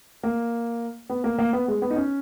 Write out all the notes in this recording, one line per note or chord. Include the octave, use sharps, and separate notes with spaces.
A#3
B3
A#3
A#3
B3
G#3
B3
D#4
C#4